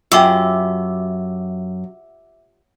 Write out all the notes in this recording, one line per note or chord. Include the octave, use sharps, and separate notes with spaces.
F#2 F4 G4 E5 D6 E6